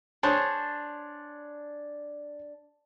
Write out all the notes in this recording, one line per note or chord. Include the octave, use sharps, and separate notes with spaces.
D4 G#4 C5 C#5 A5